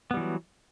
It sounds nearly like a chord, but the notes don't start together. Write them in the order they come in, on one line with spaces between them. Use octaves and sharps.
B3 G3 E3 F#3